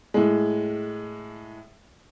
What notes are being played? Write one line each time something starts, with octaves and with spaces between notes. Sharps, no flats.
A2 G#3